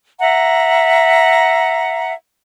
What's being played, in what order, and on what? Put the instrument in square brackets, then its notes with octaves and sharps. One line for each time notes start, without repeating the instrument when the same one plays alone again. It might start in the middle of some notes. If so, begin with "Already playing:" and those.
[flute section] E5 F#5 A#5